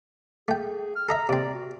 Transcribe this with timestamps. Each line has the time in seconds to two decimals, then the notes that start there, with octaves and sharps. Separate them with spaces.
0.48 A3 G#4 G5
0.96 F6
1.09 A4 D#5 E5 A#5
1.29 C3 C4 D5
1.54 F#4